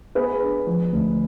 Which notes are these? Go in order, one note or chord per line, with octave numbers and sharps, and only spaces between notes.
B3 G#4 B4
D4
F3
D2